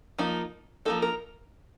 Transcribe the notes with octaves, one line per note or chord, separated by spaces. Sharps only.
F3 A#3 D#4
F3 A#3 D#4 A4
A#4